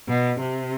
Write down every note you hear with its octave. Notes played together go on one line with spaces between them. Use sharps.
B2
C3